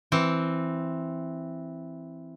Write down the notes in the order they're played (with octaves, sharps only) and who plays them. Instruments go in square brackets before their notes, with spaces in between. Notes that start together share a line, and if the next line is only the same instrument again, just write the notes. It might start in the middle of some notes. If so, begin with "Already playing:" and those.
[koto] E3 C4